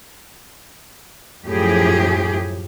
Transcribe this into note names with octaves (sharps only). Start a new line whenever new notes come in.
F#2 A2 F3 G4 G#4